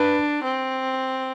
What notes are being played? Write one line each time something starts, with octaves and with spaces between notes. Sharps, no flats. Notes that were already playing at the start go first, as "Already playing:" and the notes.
Already playing: D4 B4
C4